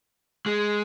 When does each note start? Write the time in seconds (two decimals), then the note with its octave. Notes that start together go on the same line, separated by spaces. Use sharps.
0.46 G#3